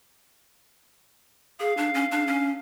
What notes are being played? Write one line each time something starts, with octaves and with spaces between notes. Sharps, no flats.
G#4 F5
D4
C#4
D4
C#4